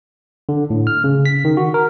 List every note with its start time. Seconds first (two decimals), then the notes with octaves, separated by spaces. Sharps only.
0.49 D3
0.70 A2
0.87 F6
1.04 C#3
1.26 B6
1.45 D#3
1.57 F#4
1.74 A#4